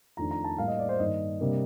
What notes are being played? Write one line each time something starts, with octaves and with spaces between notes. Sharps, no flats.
F2 D#3 A3 D4 A#5
A#5
A5
A2 G3 A#3 F5
D#5
D5
C5
G2 D#3 A#3 D4 D#5
C3 G3 A#3 D4